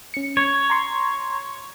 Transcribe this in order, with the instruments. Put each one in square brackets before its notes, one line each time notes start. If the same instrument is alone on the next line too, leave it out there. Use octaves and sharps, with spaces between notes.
[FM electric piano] C#4 C#7
[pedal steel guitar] C#5
[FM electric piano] A#5 C6 C#6